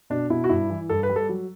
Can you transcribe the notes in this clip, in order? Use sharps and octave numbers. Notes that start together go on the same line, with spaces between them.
B2 D4
B2 E4
F#4
G2 E4
E3
G2 A4
B4
G3
A4
F#3